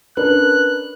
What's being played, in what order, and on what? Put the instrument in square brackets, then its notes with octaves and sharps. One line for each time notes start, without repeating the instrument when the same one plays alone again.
[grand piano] C#4 D4 A#4 [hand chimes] B4 [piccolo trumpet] F#6